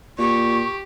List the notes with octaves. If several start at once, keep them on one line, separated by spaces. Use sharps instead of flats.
A#2 G4 C#6